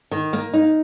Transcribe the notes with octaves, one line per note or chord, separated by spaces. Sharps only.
D#3
A#3
D#4